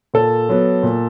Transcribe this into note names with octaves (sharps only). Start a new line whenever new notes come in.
A#2 A4
F#3 B3
A#2